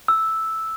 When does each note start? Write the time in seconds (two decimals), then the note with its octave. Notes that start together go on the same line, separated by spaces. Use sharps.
0.08 E6